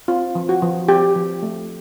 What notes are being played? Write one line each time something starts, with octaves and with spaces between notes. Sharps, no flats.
C4 F4
F3
F#4
F3
C4 G4
F3
A3